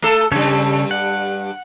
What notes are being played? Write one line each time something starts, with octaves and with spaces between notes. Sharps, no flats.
A3 A4
G2 C#3 G3 A4 C#5
F#5